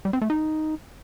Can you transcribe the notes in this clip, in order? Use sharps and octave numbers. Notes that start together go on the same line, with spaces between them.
G3
C4
A3
D#4